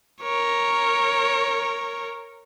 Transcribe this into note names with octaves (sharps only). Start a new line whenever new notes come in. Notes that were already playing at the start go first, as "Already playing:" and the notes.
A#4 C#5